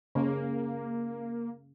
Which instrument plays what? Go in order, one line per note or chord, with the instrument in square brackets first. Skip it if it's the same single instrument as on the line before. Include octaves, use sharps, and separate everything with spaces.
[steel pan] C#3 [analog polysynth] A#3